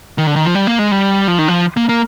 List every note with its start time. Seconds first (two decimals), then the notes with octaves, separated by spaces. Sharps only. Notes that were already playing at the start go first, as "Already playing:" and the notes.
0.18 D#3
0.27 D3
0.36 D#3
0.46 F3
0.55 G3
0.67 A#3
0.79 G#3
0.91 G3
1.28 F3
1.39 D#3
1.48 F3
1.77 A#3
1.89 A#3